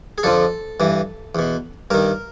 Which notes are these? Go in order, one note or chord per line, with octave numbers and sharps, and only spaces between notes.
G#4
F2 D3 F3 A4
G2 E3
E2 B2
G2 D#3 A#4